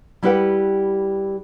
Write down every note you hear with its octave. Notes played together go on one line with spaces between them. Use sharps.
G3 E4 G4 B4 F#5 G5